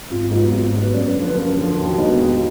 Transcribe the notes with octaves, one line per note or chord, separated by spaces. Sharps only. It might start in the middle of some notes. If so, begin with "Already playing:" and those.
G#1 F4
G#2 F#3 B3 F4
G#1
G#2 F#3 B3 B4
F#2 D5
B4
D3
F3 B4
F#2 A#4
D3
F3
D#2 F#4
D3 G#3 B3 D#4
D#2